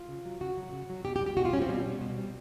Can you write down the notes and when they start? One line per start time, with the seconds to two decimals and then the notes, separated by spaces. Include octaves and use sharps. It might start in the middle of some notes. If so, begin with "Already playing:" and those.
Already playing: F4
0.09 C#3
0.25 F#3
0.41 C#3 F#4
0.57 F#3
0.73 C#3
0.90 F#3
1.05 B2 G4
1.16 G4
1.21 G3
1.26 G4
1.37 B2 F#4
1.45 F4
1.53 G3 C#4
1.62 C4
1.69 B2 G3
1.86 G3
2.01 B2
2.18 G3